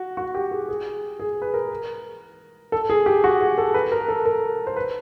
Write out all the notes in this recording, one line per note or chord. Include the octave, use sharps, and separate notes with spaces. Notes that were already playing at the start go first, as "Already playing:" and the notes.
Already playing: F#4
F#4
G4
G#4
G#4
G#4
B4
A#4
A4
G#4
G4
F#4
G#4
A4
B4
A#4
A4
A#4
C5
B4